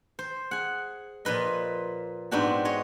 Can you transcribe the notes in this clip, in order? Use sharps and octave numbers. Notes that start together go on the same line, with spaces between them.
C5
G#4 F#5
A#2 F3 B4 D#5
G#2 B3 C4 D4 F#4 G4
G#4 C#5 D#5